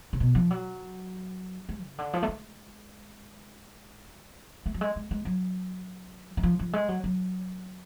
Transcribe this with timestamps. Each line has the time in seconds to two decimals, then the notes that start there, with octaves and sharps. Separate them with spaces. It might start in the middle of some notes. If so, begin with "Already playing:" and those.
0.13 C#3
0.20 B2
0.35 F3
0.51 F#3
1.69 G#3
1.83 C#3
1.98 D3
2.13 F3
2.23 A3
2.28 G#3
4.66 A3
4.74 F#3
4.81 G#3
4.96 G#3
5.11 G#3
5.25 F#3
6.37 F#3
6.43 F3
6.59 F3
6.73 G#3
6.88 F#3
7.04 F#3